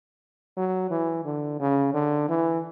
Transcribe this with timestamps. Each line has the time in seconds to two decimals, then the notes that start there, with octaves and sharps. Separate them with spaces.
0.57 F#3
0.91 E3
1.25 D3
1.60 C#3
1.94 D3
2.29 E3